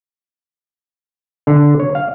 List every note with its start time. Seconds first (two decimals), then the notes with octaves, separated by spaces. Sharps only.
1.47 D3
1.80 C#5
1.95 F5